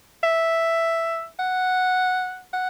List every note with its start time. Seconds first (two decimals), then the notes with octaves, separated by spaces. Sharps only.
0.24 E5
1.39 F#5
2.54 F#5